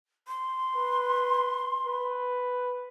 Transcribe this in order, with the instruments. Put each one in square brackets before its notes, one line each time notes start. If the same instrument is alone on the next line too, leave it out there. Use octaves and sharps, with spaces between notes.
[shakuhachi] C6
[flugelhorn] B4
B4